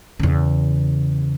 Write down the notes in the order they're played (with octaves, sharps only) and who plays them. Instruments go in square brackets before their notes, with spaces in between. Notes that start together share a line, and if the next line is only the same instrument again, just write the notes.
[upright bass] E2 C#3